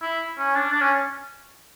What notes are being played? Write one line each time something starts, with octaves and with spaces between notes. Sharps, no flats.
E4
C#4
D4
D4
C#4